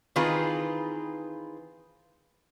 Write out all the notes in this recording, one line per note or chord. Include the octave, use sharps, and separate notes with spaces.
D#3 E3 C4 F4 G#4 B4